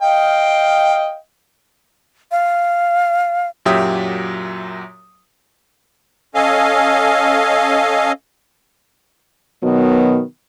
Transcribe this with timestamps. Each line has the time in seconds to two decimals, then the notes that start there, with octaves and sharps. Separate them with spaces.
0.01 D#5 F5 G5
2.32 F5
3.66 F#2 A#2 F#3 G4 E5 D#6
6.35 C#4 A4 D#5 F5 G#5
9.63 B2 D#3 F#3 B3